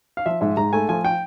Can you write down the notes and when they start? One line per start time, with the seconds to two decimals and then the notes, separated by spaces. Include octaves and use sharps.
0.17 F5
0.26 F3 E5
0.41 G#2 E5
0.57 G#2 A#5
0.73 A3 G#5
0.89 F3 G#5
1.05 G5